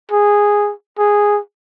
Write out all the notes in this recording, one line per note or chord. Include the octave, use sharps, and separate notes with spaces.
G#4
G#4